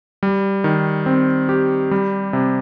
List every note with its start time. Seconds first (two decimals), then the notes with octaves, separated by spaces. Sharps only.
0.23 G3
0.64 D#3
1.06 C4
1.49 G4
1.91 G3
2.33 C3